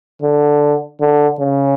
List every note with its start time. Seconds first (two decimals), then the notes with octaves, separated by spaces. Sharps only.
0.22 D3
1.01 D3
1.40 C#3